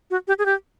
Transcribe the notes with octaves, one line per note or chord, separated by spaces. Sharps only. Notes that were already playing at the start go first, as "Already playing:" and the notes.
F#4
G4
G#4
G4